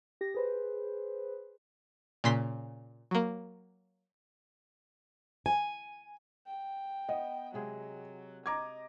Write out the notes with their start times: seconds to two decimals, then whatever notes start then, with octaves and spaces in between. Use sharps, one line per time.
0.21 G4 A#6
0.34 G#4 B4 C5
2.24 A#2 C#3 C6 B6
3.11 F#3 A#3
5.46 G#5
6.47 G5
7.09 B3 D#5
7.54 C3 F#3 G#3 G#4
8.46 D#5 A#5 D6 G#6